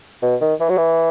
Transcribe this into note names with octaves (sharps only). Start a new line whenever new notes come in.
B2
D#3
E3
F#3
E3